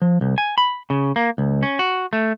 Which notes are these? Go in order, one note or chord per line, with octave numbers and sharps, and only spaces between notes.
F3
C2
G#5
B5
C#3
A#3
C#2
C#4
F#4
A3